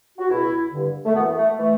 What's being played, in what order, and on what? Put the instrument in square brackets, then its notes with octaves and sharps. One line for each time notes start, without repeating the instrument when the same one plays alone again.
[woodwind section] F#4
C#2 B2 E4
G2 D3
A3
F#2 E3 B3
A3
E3 A3